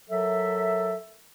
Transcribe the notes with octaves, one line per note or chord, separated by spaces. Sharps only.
F#3 A4 A#4 E5